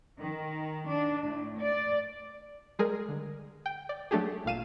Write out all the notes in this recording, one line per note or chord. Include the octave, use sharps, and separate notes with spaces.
D#3
D4
A2
D5
G3 G#3 G#4 A#4
D3
G5
D5
F#3 A3 D4 G4 G#4
G#1 A#2 F5 D#7 E7